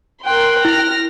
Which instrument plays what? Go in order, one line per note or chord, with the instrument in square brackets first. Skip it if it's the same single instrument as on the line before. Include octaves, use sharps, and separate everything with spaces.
[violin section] A#4 C6 [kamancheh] G5 F#6
[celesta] E4 [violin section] F6 A#6